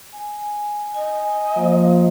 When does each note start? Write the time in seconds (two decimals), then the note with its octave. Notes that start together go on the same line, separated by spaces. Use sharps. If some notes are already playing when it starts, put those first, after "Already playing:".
0.13 G#5
0.95 D#5 G#5
1.57 F3 A#3